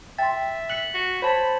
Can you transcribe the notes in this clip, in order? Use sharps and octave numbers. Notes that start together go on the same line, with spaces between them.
E5 G5 C6 A6
F#6 B6 C#7 F#7
F#4
C5 C#5 A5 B5